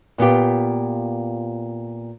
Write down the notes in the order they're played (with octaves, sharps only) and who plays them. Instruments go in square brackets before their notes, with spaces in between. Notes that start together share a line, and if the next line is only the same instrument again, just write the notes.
[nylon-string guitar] A#2 B3 F4 G4